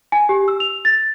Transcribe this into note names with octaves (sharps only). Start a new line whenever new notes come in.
G#5
G4
E6
F7
A6